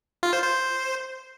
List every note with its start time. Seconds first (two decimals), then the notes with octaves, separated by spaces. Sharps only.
0.23 F4
0.33 C5
0.43 C5